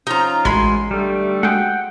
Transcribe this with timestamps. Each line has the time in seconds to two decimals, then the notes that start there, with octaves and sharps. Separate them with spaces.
0.07 F3 C#4 D#4 F4 A#5
0.45 A1 F#2 G#3 B5 C6 G#6
0.91 D3 G3 A3
1.43 G#3 F#4 G#4 F#5 G5